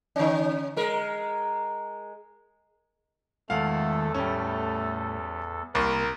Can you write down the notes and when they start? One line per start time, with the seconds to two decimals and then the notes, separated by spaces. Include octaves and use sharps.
0.16 D3 C#4
0.77 G#3 A#4
3.50 E2 D#3 G#3 A3 F4 A4 F5 F#5
4.14 A2 G3 A3 C#4
5.75 C2 C3 A#3 A#4 C6 C#6